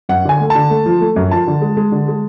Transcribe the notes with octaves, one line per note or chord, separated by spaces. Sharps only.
F#2 F#5
D3 G#5
A3
A5
D3
A3
F3
A3
F#2
F3 A5
D3
G#3
G#3
D3
G#3